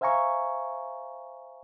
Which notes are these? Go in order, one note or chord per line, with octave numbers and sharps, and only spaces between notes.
C5 E5 F5 G#5 A#5 C#6